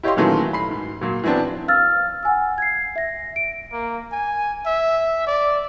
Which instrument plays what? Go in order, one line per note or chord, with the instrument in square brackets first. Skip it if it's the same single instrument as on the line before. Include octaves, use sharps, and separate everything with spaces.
[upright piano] E4 G4 C#5 D#5 F5 C6
A#2 D#3 E3 F#3 A3 C#4
B5 C7
G#2
A#2 F#3
E3 F#3 B3 C4 D4
[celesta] F5 E6 F6 A6
F#5 G#5 E6
G#6 C7
E5 A#6
D7
[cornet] A#3
G#5
E5
D5